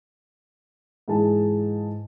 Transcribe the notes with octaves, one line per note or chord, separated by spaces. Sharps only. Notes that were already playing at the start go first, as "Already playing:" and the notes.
G#2 E3 G#4 A5